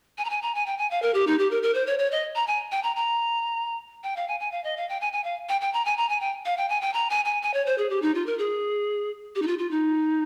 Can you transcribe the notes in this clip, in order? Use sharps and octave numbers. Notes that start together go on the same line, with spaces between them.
G#5
A#5
G#5
A#5
G#5
G5
G#5
F5
A#4
G4
D#4
G4
A#4
A#4
C5
C#5
C#5
D#5
A#5
G#5
G5
A#5
A#5
G5
F5
G#5
G#5
F5
D#5
F5
G5
G#5
G#5
F5
G5
G5
A#5
G#5
A#5
G#5
G5
F5
G5
G#5
G5
A#5
G#5
G#5
G#5
C#5
C5
G#4
G4
D#4
F4
A#4
G#4
G4
D#4
F4
F4
D#4